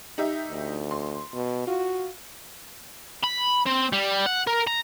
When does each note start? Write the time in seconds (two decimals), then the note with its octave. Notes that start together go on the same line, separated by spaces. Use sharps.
0.18 D#4 G4 E5
0.50 D2
0.91 C6
1.34 B2
1.67 F4 F#4
3.23 B5
3.66 C4
3.93 G3
4.26 F#5
4.47 A#4
4.67 A#5